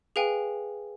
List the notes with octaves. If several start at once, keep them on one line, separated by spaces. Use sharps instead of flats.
G#4 B4 F5 G5 G#5